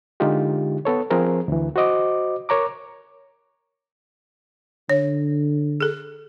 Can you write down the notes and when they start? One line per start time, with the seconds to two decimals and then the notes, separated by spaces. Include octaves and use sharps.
0.20 D3 G#3 D#4 F4 G4
0.85 B3 A4 C#5
1.11 F3 C4 G#4 A#4
1.48 D2 E3
1.76 F#4 C5 D#5 D6
2.49 A#4 C#5 A#5 D6
4.90 D3 C#5
5.81 G#4 A4